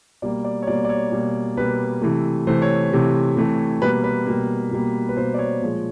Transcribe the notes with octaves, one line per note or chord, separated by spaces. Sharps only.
B2 G3 A#3 D5
D5
C#5
B2 G3 A#3 D5
D5
C#5
B2 G3 A#3
B2 G3 A#3 B4
C3 E3 A3
C3 E3 A3 C5
C#5
C3 E3 A3
C3 E3 A3
B2 G3 A#3 B4
B4
B2 G3 A#3
B2 G3 A#3
B4
B2 G3 A#3 C5
D5
C#5
A#2 F3 G#3